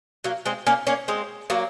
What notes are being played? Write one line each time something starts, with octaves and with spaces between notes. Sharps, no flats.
F#3 A#3
G#3 C4
A#3 C#4
A#3 C#4
G#3 C4
F#3 A#3